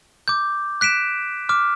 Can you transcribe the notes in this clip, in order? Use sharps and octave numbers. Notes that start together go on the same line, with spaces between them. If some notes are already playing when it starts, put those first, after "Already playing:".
D6 G6
F#6 B6 D7 E7
D6 F6